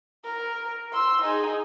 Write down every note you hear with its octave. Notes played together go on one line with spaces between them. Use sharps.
A#4
C6 E6
D#4 G#4